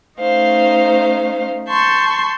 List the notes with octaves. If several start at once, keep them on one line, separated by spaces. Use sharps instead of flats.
A3 C#4 D#4 C5 F5
A5 C6 C#6 G6